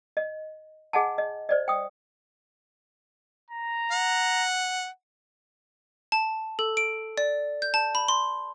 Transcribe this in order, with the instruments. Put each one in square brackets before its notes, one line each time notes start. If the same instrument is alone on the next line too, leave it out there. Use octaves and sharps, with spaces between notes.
[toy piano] D#5
G#4 D#5 F#5 G#5 A5
D#5
C5 D5 D#5
G5 D#6
[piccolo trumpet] A#5
[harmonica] F#5
[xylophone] A5
A4
D7
D5
G6
A5
B5
C6